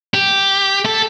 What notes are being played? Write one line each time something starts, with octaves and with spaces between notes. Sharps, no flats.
G4
A4